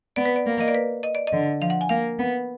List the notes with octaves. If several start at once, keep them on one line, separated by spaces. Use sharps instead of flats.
B3 D5
B4
D5
A#3
D#5
D5
B4
D#5
D5
D#5
D3
F3 F5
F#5
G#5
A#3 F5
B3